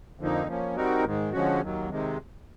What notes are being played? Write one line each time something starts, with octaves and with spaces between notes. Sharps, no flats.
F2 D3 F3 A#3 D#4
F3 A#3 C#4
G3 C4 D#4 F#4 A#4
G#2 D#3 G#3
D3 F3 G#3 C#4 F#4
D#2 D#3 F#3
C3 D#3 G#3